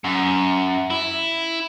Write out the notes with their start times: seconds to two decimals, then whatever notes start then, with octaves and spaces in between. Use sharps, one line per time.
0.04 F#2
0.90 E4